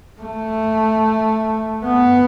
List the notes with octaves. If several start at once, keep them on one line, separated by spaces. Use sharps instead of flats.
A3
B3